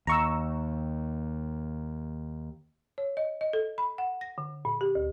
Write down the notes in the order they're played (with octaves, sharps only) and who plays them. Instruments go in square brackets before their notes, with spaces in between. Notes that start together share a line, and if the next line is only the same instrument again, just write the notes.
[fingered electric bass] D#2 [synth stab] A#5 C#6 E6
[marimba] C#5
D#5
D#5
A4
B5
F#5
A#6
D3
A#2
G4
D2